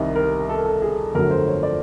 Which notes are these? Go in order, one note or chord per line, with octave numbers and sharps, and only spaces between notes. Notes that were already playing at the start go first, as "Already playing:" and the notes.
Already playing: C2 C3 D#3 G3 D#5
A#4
A4
A#4
A4
G#4
G1 F2 D3 F#3 A3 A#4
C5
C#5
D5